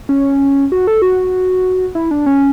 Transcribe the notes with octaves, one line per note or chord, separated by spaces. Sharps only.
C#4
F#4
A4
F#4
E4
D4
C#4